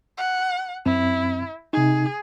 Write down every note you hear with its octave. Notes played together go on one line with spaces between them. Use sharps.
F#5
F#2 C4 E4
C3 D#4 G#4